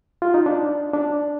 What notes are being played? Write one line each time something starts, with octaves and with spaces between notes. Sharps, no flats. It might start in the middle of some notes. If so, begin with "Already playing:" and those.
F4
D#4
D4
D4